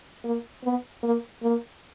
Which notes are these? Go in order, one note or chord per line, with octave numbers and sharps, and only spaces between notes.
A#3
B3
A#3
A#3